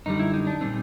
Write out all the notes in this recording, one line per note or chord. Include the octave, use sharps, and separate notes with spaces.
F#2 D3 G3 D#4
E4
D#4
D4
A#2 G3 C4 D#4